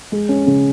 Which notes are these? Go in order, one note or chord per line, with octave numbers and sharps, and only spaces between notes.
G#3
C#4
C#3